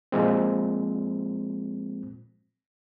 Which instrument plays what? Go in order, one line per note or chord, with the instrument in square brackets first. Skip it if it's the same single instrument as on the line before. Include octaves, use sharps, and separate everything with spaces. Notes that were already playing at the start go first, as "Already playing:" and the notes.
[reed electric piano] A#2 F3 G#3 C4